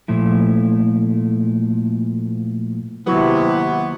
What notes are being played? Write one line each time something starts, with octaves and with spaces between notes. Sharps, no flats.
A#2 F3 A3 E4
D#2 C3 F#3 B3 E4